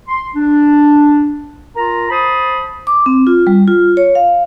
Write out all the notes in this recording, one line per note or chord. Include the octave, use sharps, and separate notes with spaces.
C6
D4
F4 A#4 A#5
C5 A5 B5 D#6
D6
C4
F4
G3
F4
C#5
F5